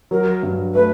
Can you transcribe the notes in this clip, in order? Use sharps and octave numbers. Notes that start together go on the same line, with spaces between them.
F#3 A#4
G2
A3 B4